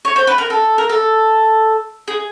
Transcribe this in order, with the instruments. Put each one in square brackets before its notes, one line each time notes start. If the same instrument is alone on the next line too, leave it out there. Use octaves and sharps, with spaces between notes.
[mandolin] C#5
C5
B4
A#4
A4
A#4
A4
G#4